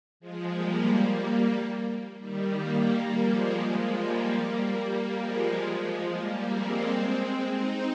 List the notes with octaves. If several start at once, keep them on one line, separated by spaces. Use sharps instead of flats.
F3 G#3
G3 A#3
D#3 G3
G3 A#3
G3 A#3
F3 G#3
G3 A#3
G3 A#3
F3 G#3
F3 G#3
G3 A#3
G#3 C4
C4 D#4